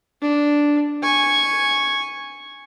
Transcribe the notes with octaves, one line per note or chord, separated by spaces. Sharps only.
D4
G#5 C#6